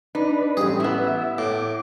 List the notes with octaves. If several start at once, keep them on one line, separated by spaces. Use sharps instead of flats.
D4 D#4 B4
A1 G3 G#4
B3 E4 E5
A2 D6